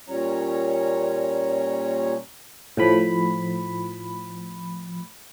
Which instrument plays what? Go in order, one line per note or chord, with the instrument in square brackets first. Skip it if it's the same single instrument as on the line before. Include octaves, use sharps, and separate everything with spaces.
[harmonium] A#2 G3 C#4 C#5 A#5
[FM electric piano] A2 F3 B5